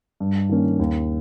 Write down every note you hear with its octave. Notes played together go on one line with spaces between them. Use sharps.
G2
D#3 A#3 C#4
D#2